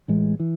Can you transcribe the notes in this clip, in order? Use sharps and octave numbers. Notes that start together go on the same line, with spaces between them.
A1 A2 E3 G#3
E3